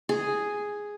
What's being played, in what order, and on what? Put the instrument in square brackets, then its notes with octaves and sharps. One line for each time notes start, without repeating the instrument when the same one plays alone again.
[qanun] G#4